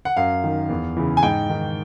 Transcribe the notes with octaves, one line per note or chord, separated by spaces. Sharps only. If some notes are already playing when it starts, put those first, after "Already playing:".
F#5
F#2 F5
D#3
E2
C#3 E3
G#5
G#2 G5
D#3